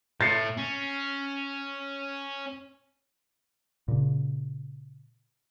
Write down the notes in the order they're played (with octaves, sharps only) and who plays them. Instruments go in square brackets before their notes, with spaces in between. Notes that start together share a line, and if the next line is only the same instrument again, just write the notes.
[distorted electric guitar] A2 [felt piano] A6 C7 C#7
[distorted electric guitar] C#4
[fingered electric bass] A#2 C#3